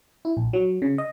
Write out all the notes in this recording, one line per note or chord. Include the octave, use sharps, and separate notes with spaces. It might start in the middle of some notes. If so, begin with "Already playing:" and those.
E4
A#1
F#3
C#3
D#5